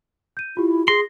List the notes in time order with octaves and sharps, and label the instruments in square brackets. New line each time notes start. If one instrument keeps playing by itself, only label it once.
[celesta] G6 D#7
[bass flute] E4 [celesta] F4 G4
[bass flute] G#4 [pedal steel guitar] C6 [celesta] A#6